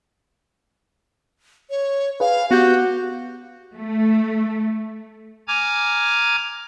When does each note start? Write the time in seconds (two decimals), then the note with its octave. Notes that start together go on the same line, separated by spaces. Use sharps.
1.70 C#5
2.20 G#4 B4 F5
2.51 B3 F#4 G4 G6
3.75 A3
5.48 G#5 A#5 D6 F6 G#6